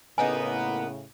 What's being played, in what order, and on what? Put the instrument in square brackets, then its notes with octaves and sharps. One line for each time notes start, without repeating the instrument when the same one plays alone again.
[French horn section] A2 C#3 [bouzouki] A#3 D#4 F4 [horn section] B3 [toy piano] G#5